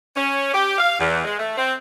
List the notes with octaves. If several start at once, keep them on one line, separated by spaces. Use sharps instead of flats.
C#4
G4
F5
E2
G#3
A3
C4